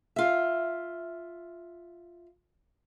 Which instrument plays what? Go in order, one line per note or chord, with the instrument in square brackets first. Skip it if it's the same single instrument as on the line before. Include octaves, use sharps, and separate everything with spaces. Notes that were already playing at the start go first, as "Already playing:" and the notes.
[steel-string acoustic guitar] F4 E5